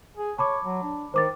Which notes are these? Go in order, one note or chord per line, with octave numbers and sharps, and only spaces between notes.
G#4
C#5 A5 B5 D6
F#3
D4
D#3 C5 D6 A6